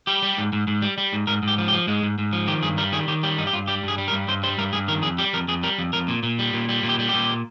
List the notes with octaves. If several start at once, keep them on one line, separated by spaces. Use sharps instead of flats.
G3 G4
G3
G#2
G#2
G#2
G3
G3
G#2
G#2 A#4
G#2
G4
F3
G4
F3
G#2 G#3
G#2
G#2
F3
D#3 G4
G2 G#4
G3 A#4
D#3 G#4
D#3 G4
G3 G4
G2 D#4
G4
G2 F4
G3 G4
G2 G#4
G3
A#4
G2
G2 C5
G3 C5
G2 A#4
G2 G#4
D#3 A#4
F2 G#4
G3 G4
F2 A#4
F2 G#4
G3 A#4
F2
F2 A#4
A#2
A#2
G3
A#2
G3
A#2
G4
G3
G4
A#2